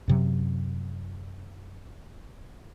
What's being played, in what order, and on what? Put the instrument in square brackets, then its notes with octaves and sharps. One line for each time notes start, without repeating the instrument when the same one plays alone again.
[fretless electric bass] F#2 C3 F#3